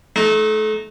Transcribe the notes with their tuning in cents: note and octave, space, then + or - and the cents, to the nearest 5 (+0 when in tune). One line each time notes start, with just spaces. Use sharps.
A3 -30 D#4 +0